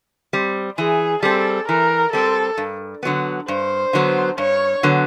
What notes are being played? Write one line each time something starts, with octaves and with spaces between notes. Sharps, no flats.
G3 C4
E3 G#4
G3 C4 A4
E3 A#4
G3 C4 A4
G2
D3 F#3 B3
G2 C5
D3 F#3 B3
G2 C#5
D3 F#3 B3